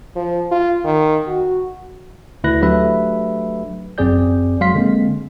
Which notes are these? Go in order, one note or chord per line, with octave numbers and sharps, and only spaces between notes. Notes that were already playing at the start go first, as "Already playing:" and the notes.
F3
F4
D#3
F#4
D2 E4 B4 F#6 A#6
F#3 A3 D4 G4 B4 E5
G1 F#2 C4 G#4 D5 G6
F#3 G#3 F5 C6 B6
D3 G#3 A#3 C4